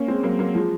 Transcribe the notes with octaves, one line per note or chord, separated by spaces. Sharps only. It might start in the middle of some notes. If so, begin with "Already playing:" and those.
Already playing: A#3 C#4
G#3 C4
F#3 A#3
F#3 A#3
F3 G#3